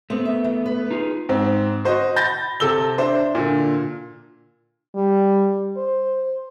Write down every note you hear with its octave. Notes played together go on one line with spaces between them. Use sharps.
A3 B3 C4
E5
E3
B4
D#4 F4 G#4
G#2 C4
F#4 C5 D#5
B5 G6 A6 A#6
C3 A4 E6 G7
D4 C5 E5
A#2 D3
G3
C5